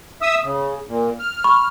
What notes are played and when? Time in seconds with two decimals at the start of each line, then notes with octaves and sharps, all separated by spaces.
0.22 E5 D#6 E6
0.44 C#3 D#6
0.88 A#2
1.20 F6
1.44 B5 C#6